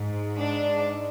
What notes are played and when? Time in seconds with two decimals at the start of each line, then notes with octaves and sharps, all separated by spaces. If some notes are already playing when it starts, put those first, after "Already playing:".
Already playing: G#2
0.40 D4